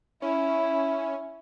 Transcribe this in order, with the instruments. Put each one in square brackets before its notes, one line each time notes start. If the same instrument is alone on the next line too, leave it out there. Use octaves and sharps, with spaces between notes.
[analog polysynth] C#4 [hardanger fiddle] E4